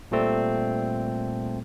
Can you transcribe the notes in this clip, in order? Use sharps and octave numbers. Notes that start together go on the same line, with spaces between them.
A#2 G3 A3 C4 A4